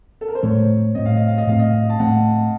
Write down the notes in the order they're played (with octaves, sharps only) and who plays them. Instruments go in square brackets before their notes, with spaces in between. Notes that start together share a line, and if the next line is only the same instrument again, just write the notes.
[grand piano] A4
A#4
C5
[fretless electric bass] A2 A3 C4 [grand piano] C#5
[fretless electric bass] A2 A3 C4 [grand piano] D#5
[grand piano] F5
D#5
F5
D#5
[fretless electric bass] A2 A3 C4 [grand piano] F5
[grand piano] D#5
A5
[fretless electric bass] A2 A3 C4 [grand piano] F#5